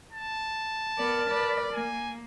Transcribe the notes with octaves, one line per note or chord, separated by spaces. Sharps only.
A5
B3 A#4 D5
B4 D5
A#3 G#5